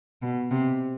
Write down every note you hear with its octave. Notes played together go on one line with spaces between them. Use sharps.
B2
C3